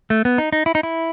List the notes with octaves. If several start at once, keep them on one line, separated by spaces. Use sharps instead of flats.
A3
B3
D#4
D#4
E4
D#4
E4